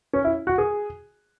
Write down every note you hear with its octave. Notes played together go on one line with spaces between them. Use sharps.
C#4
E4
F#4
G#4